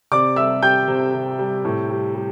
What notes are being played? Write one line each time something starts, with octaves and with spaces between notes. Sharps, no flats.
C3 D5 D6
G3 E5 E6
G3 G5 G6
C3
C3
G3
A2
G3
G3